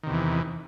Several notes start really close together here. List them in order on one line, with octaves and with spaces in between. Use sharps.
D#3 C3 E2 E3